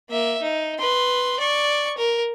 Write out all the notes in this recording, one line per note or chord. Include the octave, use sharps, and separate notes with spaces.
A#3 E5
D#4
B4 C6
D5 C#6
A#4